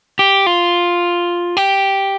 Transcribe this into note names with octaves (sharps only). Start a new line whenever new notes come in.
G4
F4
G4